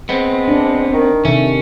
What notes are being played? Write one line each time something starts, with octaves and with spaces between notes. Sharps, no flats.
G#3 B3 C4
D4
D#3
C3 D#3 A3 C#4